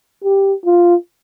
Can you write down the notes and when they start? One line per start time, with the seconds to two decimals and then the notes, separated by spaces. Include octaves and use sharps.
0.24 G4
0.65 F4